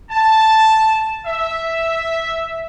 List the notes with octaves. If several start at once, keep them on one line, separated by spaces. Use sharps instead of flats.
A5
E5